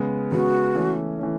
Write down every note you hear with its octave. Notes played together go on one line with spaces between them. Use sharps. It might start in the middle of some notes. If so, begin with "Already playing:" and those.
Already playing: C#3 G#3 B3
C#3 G#3 B3 F#4
E3 A3 C#4
E3 A3 C#4